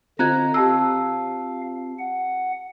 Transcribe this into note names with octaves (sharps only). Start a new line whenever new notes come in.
D3 C4 F4 D#5 A#5 F#6 G#6
G4 F5 A5 E6
F#5